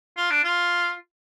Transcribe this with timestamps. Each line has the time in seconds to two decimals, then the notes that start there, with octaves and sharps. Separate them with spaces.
0.17 F4
0.30 D4
0.44 F4